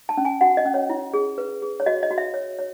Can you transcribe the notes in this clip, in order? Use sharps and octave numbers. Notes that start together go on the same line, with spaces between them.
A5
C#4
G#5
F#4 F#5
D#5
C#4
C#5
E4
G#4
B4
G#4
C#5
F#4 D#5
D#5
F#4
E5
C#5
C#5